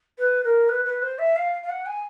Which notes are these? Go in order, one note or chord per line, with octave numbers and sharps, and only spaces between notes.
B4
A#4
B4
B4
C5
E5
F5
F5
F#5
G#5